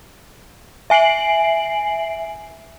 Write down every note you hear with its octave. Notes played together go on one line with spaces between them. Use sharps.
E5 G#5 C7 D7 F#7